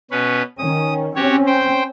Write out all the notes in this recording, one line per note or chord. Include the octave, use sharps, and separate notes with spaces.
B2 C#4 B4
D#3 C#4 D#6
C4 C#4 F#4 G4 C#5
C5 G5